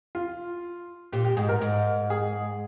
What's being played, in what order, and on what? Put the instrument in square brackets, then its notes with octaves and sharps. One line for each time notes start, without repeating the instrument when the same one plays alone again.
[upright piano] F4
[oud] A#2 [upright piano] G4
[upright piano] G4
[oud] G#2 [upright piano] G#4
[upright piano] A#4
[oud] G#2
[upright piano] G#4